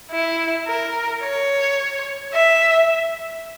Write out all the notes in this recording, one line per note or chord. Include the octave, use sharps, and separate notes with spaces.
E4
A#4
C#5
E5